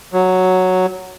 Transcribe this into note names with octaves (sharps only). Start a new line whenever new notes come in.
F#3